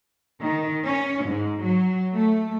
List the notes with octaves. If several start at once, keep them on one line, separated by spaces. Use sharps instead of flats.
D#3
C#4
G#2
F#3
A3